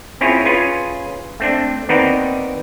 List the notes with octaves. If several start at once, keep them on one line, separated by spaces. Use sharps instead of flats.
C4 C#4 E4 F4 G#4 C#5
C#4 F4 G#4 B4 G#5
A3 C4 D4
D#2 B3 C4 D#4 A#4 D5